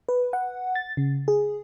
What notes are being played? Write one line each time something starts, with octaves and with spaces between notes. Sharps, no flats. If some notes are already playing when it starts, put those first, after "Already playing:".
B4
F#5
A6
C#3
G#4